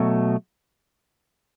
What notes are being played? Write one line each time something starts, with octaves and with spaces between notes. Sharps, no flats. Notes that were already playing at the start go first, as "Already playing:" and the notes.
Already playing: B2 F#3 A3